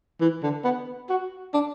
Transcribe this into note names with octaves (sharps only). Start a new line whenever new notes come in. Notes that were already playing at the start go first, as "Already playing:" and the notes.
E3
D3
B3
F#4
D4